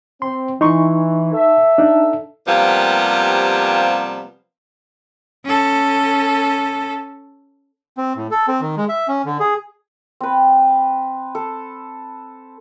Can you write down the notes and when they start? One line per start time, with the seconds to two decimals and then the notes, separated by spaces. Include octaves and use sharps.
0.22 C4 C6
0.61 E3 D#4 C6 C#6
1.33 A4 E5
1.78 D4 D#4
2.47 C3 F3 G3 A#3 B3
5.44 C#4 A4
7.97 C4
8.16 A2
8.31 A4
8.48 C4
8.61 D#3
8.77 G#3
8.89 E5
9.08 C#4
9.25 D3
9.40 G#4
10.21 C4 B4
11.35 A4